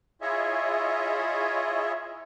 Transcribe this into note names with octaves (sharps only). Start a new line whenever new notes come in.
E4 F4 G#4 C#5 D#5 E5